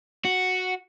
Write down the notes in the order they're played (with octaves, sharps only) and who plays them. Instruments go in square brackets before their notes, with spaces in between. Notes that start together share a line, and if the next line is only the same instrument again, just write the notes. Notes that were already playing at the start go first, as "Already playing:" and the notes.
[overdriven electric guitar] F#4